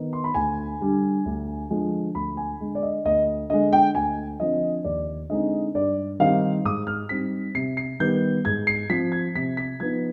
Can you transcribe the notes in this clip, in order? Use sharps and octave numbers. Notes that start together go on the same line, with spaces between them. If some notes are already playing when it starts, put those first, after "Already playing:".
Already playing: D#3 B3 D#4
C6
B5
D2 G#5
D3 G3 D4
D2
D3 F3 G#3
D2 B5
G#5
D3 G#3
D5
D#5
D2 D#5
D3 G#3 D#5
G5
D2 G#5
D3 F3 C4 D#5
D#2 D5
D3 G#3 C4 D#4 D#5
G2 D5
D#3 G3 C4 D#4 F5
G#2 D#6
F6
G3 C4 D#4 B6
C3 C7
C7
D#3 G3 B3 G6
G#2 G#6
C7
F3 C4 B6
G#6
C3 B6
B6
F3 B3 D#4 G#6